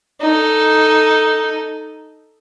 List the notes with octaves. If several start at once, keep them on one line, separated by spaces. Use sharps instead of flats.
D#4 A4